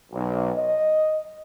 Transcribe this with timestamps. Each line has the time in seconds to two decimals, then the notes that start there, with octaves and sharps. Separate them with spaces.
0.12 B1
0.56 D#5